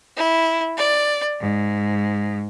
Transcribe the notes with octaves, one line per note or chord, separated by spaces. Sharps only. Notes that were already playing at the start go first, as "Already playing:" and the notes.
E4
D5
G#2